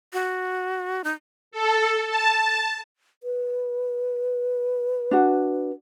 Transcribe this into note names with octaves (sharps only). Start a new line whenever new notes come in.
F#4
D#4
A4
A5
B4
D4 F#4